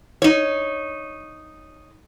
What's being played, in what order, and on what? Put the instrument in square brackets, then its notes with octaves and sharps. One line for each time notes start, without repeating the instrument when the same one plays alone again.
[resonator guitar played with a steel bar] D#4 C#5